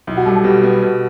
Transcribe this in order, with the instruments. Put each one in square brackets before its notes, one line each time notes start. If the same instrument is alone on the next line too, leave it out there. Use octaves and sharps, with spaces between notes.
[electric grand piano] B1 [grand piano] E4
[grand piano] F#4
[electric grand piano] G3 [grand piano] A4
[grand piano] A4
[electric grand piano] B2 [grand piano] G4
[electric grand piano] B3
B2